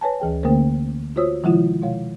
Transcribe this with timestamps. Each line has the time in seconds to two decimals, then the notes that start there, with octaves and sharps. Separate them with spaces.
0.01 B4 C#5 G#5 A5
0.20 D2 E3 G#4 G5
0.43 D3 A3 A#3 C#4 A#4 C5
1.16 F4 F#4 C5 C#5 D#6 E6
1.43 C3 D#3 F3 G#3 E4 F4
1.82 B2 G#3 C#5 F5